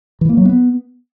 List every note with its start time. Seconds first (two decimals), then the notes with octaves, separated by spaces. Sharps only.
0.21 E3
0.29 A#3
0.37 F#3
0.45 B3